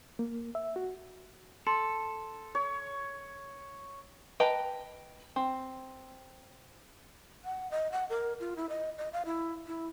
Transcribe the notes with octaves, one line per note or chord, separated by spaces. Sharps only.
A#3
E5
F#4
A4 C6
C#5
B4 D#5 G5 A5 A#5
C4
F#5
D#5
F#5
A#4
F4
E4
D#5
D#5
F5
E4
E4